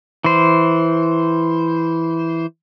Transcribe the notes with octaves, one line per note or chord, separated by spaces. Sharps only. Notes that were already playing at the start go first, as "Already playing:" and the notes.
E3 C5